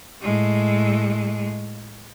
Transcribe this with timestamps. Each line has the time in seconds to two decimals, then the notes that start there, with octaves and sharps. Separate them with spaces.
0.22 A2 G#3